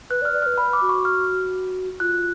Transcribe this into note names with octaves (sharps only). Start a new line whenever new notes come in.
B4 F#6
D5
F6
D5
F6
B4
B5
D6
F#4
C#6
F6
F4 F#6